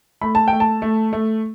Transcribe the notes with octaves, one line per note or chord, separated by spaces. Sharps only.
A3 B5
A5
A3 G5
A5
A3
A3